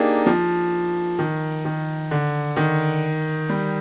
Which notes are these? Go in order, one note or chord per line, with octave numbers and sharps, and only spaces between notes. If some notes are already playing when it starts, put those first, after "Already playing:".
Already playing: A#3 D4 D#4 G4 G#4
F3
D#3
D#3
D3
D#3
G3